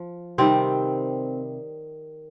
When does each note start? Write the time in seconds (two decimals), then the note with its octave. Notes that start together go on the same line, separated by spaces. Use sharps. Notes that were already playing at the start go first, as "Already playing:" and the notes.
Already playing: F3
0.38 C3 D#3 G3 C4